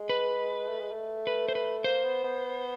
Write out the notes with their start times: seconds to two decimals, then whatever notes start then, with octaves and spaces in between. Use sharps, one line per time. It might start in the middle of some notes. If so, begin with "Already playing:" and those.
Already playing: G#3
0.09 B4
0.68 A3
0.80 G#3
0.92 A3
1.27 B4
1.49 C5
1.55 B4
1.84 A#3 C5
2.04 B3
2.24 B3